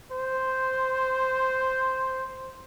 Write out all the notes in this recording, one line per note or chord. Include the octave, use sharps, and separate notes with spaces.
C5